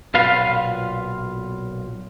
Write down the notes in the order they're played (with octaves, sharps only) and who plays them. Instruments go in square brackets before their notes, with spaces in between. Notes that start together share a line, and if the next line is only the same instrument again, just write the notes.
[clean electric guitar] B1 A#2 F4 B4 F5